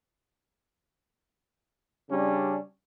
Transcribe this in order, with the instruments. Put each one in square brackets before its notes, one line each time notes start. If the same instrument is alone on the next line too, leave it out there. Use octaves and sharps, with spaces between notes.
[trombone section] C#3 G3 C#4 D4